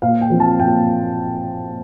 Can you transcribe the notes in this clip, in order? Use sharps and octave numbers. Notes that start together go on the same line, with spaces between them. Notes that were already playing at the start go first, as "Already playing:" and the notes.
A#2 F5
G5
F3 C4
A5
A#2 G5